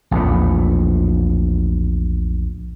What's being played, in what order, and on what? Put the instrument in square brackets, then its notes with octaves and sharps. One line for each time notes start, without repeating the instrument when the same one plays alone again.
[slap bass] A#1 E2 A2